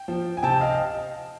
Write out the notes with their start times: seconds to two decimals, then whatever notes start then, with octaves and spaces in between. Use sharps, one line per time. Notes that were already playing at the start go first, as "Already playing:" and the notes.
Already playing: G5
0.08 F3
0.37 G#5
0.43 C3 G5 A5
0.60 D#5 F5
0.74 D#5